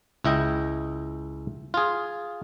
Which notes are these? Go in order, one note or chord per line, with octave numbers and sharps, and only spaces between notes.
C#2 E4 D#5 G5
F4 G#4